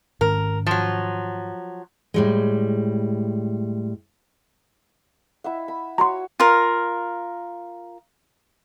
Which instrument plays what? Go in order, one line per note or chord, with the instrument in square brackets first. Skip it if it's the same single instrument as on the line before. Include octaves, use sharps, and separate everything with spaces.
[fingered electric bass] G#2 D#3 C#4 [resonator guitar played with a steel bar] A#4
[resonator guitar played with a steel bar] F3 F#3
[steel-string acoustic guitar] A2 G3 G#3
[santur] E4 E5 F#5
B5
[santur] F#4 C#5 [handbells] A#5 C6
[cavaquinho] F4 A#4